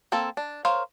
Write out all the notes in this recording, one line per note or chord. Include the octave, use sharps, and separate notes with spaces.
A#3 C4 A4
D4
A#4 C5 C#5 F5